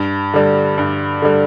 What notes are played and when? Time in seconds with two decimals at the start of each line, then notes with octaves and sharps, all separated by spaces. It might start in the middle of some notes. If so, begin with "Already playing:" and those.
Already playing: G2
0.34 D3 G3
0.78 G2
1.22 D3 G3